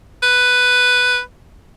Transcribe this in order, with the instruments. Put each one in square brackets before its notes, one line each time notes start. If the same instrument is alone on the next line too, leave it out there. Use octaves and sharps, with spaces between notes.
[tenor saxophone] B4